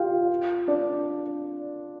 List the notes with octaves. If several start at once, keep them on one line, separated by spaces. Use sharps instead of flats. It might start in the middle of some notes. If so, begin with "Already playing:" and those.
Already playing: F4 G4 F5 G5
D4 D5